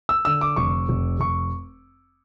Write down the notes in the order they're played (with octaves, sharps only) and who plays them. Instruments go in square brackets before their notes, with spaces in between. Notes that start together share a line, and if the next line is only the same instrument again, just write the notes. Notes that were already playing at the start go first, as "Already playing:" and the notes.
[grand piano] E6
D3 E6
D6
F1 C#6
F1
F1 C#6